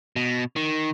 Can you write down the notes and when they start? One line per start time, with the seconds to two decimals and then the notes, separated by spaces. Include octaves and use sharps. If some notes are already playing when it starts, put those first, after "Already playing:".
0.16 B2
0.56 D#3